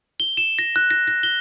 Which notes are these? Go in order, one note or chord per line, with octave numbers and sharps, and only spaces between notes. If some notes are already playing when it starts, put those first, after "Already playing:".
G7
E7
A#6
F#6
A#6
A#6
G7